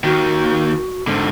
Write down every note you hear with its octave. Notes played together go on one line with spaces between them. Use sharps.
D#2 D#3 F#4
G#2 D3